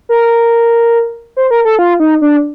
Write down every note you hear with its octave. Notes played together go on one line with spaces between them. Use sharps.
A#4
C5
A#4
A4
F4
D#4
D4